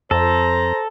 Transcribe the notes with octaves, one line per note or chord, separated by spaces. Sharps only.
F2 A4 C5 A#5